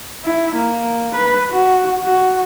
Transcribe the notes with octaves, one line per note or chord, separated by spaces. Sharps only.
E4
A#3
B4
F#4
F#4